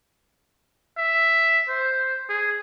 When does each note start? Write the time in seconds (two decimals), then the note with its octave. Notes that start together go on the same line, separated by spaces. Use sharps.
0.98 E5
1.69 C5
2.29 G#4